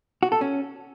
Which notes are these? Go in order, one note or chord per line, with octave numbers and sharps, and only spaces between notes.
F#4
A4
C#4